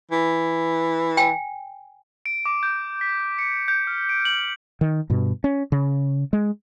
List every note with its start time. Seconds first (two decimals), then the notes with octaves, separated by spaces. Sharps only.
0.11 E3
1.17 G5 G#5
2.26 D7
2.46 D6
2.63 G6
3.01 B6
3.39 C#7
3.68 G6
3.87 F6
4.09 D7
4.25 F#7
4.81 D#3
5.10 G2 B2
5.44 C#4
5.72 C#3
6.33 G#3